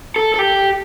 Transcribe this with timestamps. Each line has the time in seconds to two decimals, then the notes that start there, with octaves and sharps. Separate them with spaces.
0.16 A4
0.34 A4
0.39 G4